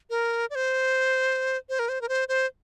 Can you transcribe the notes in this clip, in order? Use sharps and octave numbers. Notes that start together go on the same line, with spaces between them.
A#4
D5
C5
C5
A#4
C5
A#4
C5
C5